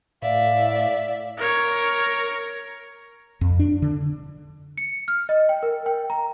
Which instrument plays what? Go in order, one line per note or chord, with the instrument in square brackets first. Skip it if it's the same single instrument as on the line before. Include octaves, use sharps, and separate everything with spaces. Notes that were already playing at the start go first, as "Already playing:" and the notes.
[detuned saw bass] A2 [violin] D5 E5 [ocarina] F5
[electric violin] A#4 C#5
[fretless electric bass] F2
D4
D3
[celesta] C#7
F6
D#5
G5
A#4
G5
A#5